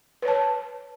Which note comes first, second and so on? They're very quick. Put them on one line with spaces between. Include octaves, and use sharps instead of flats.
B4 C#5 A5